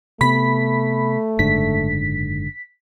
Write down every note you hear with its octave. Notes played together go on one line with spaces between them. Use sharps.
C3 A3 B3 B5 B6
F#1 G#2 D3 B6